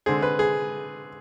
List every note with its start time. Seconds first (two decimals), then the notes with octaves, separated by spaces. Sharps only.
0.06 D3 G#3 C4 G#4
0.22 B4
0.39 G#4